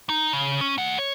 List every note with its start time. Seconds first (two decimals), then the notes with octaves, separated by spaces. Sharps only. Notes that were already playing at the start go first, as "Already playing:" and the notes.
0.09 D#4
0.33 C#3
0.61 C#4
0.78 A3 F#5
0.98 C#5